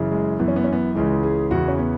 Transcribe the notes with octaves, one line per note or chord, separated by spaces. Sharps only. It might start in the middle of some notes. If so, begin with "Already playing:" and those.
Already playing: F#2 C#3 E3
G#3
F#2 E3 B3
C#4
B3
C#4
B3
C#2 C#3 E3 G#3
G#4
E2 C#3 E3 F#4
C#4
B3